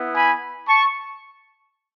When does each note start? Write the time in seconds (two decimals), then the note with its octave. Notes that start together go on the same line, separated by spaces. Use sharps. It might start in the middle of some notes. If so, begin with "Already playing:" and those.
Already playing: B3 E4
0.14 G#5 B5
0.69 A5 C#6